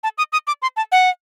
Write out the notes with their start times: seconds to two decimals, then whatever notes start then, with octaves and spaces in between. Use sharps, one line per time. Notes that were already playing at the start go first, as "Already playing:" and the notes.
0.04 A5
0.18 D#6
0.33 D#6
0.47 D6
0.62 C6
0.77 A5
0.92 F#5